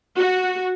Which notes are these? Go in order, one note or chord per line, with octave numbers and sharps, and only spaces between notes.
F#4